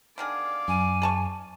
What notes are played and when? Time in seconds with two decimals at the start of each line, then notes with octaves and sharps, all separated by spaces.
0.18 D3 D#3 G#4 D5 F5
0.68 F#2 G#5
1.02 G#4 A5 C#6